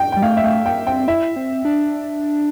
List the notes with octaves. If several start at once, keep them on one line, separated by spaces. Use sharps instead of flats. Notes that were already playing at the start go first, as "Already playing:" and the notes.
Already playing: G5
G3 G5
A3 F5
E5
A3 F5
A#3 G5
C4 G5
E4 E5
C4
D4